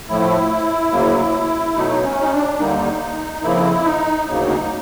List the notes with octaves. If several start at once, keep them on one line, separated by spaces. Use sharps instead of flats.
A2 F3 A3 E4
D2 C#3 F#3 A#3
B2 F#3 A3 D#4
C#4
D#4
D4
D#2 D3 G3 A#3 D#4
F2 C#3 F3 A#3 E4
D#4
D2 C#3 F#3 A#3 D#4
D#4